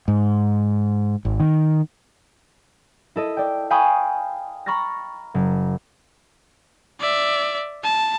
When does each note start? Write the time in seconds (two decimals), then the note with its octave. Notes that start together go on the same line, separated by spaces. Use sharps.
0.08 G#2
1.25 G#1
1.40 D#3
3.16 E4 A4 D#5
3.37 D5 G5
3.70 F5 G5 G#5 B5 C#6 D#6
4.66 A#5 B5 C#6 F6 A6 A#6
5.34 F#1
7.00 D5 E5
7.83 A5